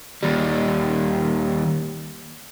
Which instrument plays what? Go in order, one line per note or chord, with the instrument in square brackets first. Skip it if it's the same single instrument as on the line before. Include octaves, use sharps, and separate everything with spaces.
[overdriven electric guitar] D#2 G3